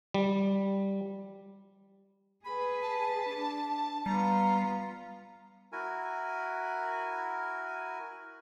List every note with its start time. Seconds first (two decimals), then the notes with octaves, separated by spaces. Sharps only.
0.14 G3
2.45 G#4 B4 B5
2.82 A5
3.29 D4
4.06 G3 B3 F4 A#5
5.72 E4 F#4 A#4 G#5